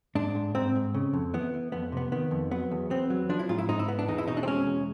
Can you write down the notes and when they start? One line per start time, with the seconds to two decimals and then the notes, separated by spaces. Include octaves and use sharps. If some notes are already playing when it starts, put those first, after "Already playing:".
0.15 G#2 D4
0.35 G#2
0.55 G#2 C4
0.75 G#2
0.94 C#3
1.13 F2
1.34 E3 B3
1.54 E3
1.72 F2 B3
1.92 C3 B3
2.12 D#3 B3
2.31 F2
2.51 F#3 B3
2.71 E2
2.90 B3 C4
3.10 F#3
3.29 F3 D4
3.39 E4
3.49 G#2 F4
3.58 E4
3.69 G#2 D#4
3.79 E4
3.88 B3
3.99 D4
4.08 E2 D#4
4.18 E4
4.28 B2 D#4
4.37 D4
4.43 C4
4.47 G#3 C#4
4.66 E2